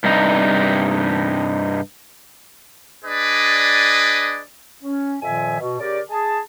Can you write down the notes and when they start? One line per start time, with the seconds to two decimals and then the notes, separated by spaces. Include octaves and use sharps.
0.04 G2 C3 D#4
3.04 D4 G#4 B4 D5 D#5
4.83 C#4
5.22 F2 A#2 D#3 F3 E5 G#5
5.60 B2
5.80 C#3 G4 A#4 D5
6.10 G#4 A5